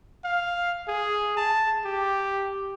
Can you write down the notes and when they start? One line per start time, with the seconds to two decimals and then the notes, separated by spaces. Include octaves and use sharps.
0.24 F5
0.88 G#4
1.37 A5
1.85 G4